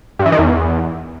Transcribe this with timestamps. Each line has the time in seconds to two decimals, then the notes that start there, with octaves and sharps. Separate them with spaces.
0.19 G2
0.26 E3
0.32 D#3
0.39 E2